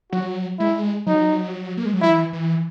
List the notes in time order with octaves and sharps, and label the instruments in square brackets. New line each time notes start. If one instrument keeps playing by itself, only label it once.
[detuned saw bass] F#3 [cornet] F#4
[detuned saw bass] G#3 [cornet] E4
[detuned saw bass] F#3 [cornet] D#4
[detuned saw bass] A#3
G#3
F#3
[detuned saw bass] E3 [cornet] E4
[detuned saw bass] E3